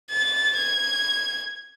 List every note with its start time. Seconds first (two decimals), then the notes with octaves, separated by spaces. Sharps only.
0.10 A6
0.56 G#6